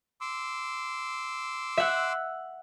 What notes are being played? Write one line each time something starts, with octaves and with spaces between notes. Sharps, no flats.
C6 D6 E6
E5 F#5